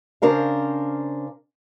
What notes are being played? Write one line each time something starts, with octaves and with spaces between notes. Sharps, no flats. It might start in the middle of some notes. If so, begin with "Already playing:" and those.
C#3 D4 A#4 C5 F5